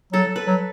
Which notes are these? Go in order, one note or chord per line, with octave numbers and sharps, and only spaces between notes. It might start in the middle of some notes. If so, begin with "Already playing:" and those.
F#3 A4
B4
F#3